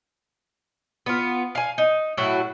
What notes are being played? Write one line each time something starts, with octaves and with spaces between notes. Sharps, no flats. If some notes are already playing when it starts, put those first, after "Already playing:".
B3 F4
F5 G#5
D#4
A2 F#3 E4 F#4